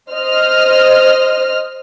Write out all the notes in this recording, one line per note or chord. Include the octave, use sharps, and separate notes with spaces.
C5 D#5 F6